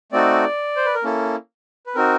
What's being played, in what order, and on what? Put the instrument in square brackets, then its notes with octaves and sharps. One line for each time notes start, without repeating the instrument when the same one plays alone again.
[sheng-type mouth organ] A3 C4 D#4 F#4 A4 D5
C5
B4
A#4
A#3 C#4 E4 A4
B4
C4 D#4 F#4 A#4